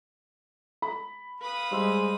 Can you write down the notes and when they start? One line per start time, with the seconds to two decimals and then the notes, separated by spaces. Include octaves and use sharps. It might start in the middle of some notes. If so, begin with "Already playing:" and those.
0.82 B5
1.42 B4 F5 D#6
1.72 G3 G#3 C5 E6